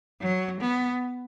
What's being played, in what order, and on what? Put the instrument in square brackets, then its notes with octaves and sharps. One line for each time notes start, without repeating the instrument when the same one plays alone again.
[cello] F#3
B3